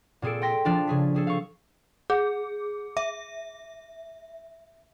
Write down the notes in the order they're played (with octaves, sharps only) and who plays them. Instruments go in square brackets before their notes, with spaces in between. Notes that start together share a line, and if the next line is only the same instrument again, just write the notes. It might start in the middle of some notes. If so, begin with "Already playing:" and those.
[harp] A#2 C4 G#4 A4 D7
G5 C6 A#6 B6
F3 D4 F4
C#3 G#4 B6
C4 G#4 A4
F5 C#6
[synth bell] G#4
E5